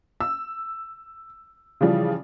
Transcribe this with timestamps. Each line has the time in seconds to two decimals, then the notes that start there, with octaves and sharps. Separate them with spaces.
0.21 E6
1.81 C#3 E3 F3 G3